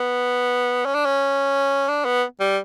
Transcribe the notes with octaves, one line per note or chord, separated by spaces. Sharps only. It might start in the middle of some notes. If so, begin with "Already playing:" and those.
Already playing: B3
C#4
D4
C#4
D4
B3
G3